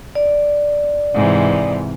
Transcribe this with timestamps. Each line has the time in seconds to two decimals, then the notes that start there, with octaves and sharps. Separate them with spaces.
0.15 D5
1.14 G#2 C3 E3